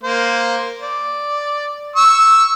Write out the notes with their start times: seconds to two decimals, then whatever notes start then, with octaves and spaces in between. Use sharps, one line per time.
0.03 A#3 C5
0.82 D5
1.96 C#6 E6